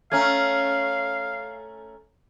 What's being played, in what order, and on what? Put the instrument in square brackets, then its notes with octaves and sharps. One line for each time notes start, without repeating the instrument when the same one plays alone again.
[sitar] A3 C#4 [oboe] F5 [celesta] A#5 F6 G#6